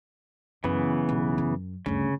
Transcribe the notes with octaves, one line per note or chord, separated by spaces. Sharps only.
F#2 C#3 E3 B3
B1 G#2
F#2
D2 G2 C#3